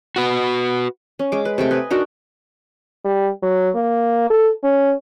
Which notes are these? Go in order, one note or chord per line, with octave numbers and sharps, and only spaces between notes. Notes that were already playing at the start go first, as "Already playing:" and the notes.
F#4 B4
C#4
G#3 D6
B4
C3 A3 G5
B4 D#5 G#5
D4 D#4 F#4 A#4
G3
F#3
A#3
A4
C#4